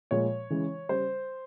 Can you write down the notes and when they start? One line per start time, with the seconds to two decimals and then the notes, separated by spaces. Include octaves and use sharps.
0.11 A#2 F3 G#3 C#5
0.50 C#3 E3 G#3
0.89 C#3 G3 C5